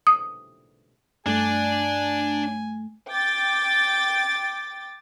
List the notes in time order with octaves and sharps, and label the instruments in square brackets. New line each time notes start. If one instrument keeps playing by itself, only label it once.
[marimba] D#6
[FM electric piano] G2 A3 [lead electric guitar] D4 D5 [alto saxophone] G#5
[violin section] G5 D6 A6